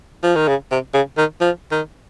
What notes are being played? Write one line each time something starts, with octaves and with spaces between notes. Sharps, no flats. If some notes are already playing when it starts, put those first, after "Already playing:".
F3
D#3
C#3
C3
C#3
D#3
F3
D#3